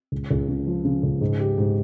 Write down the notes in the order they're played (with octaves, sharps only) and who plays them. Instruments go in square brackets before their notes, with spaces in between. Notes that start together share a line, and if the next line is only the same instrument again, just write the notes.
[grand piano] C#2
C#2
C#3
F3
C#3
C#2
G#2
G4
G#2